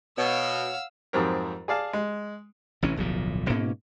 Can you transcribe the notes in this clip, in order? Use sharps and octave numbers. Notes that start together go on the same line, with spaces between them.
B2 C#5 F5 F#5 E6
F2 G#2 F#3 C4 G4 A#4
G#4 D5 F5 A5
G#3
A1 C3 E3 C#4
D1 B1 A#2 F3
G#2 B2 A#3 C#4